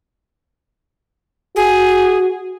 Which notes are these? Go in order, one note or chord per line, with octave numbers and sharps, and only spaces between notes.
F#4 G#4